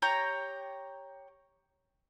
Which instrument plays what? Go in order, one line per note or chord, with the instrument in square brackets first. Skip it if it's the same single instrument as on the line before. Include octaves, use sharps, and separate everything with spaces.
[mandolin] G4 C#5 G5 A#5